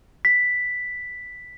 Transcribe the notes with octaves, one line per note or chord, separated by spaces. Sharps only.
B6